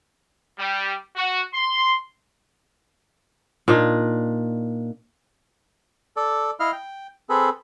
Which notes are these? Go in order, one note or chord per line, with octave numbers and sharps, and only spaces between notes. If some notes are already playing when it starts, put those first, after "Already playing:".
G3
F#4
C6
A#2 D4 D#4
A4 D5
E4 D#5 F5 F6
G5
C4 G#4 A4 B4